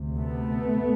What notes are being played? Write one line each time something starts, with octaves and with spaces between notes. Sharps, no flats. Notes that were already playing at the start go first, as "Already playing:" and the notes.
Already playing: D2 C3
A3 B3